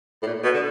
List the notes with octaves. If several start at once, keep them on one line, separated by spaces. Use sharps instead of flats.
A2
A#2
B2
D3